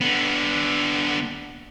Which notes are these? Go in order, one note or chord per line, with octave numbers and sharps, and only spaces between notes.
D3 B3